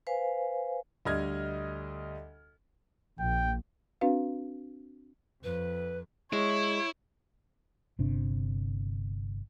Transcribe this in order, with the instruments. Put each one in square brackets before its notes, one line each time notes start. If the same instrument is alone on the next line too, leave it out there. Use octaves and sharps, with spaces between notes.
[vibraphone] B4 C5 F5 G#5
[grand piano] D2 G3 D#5 F6 G#6
[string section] A#1 [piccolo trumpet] G5
[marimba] C4 D4 F#4 B4 F5
[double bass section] F2 [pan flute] B4
[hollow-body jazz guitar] G#3 [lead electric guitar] E4 [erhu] C#5
[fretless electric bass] G1 C3 D4